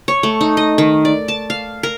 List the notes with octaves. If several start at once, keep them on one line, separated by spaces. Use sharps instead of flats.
C#5
A3
D#4
D#5
D#3
D5
A5
F5
A#4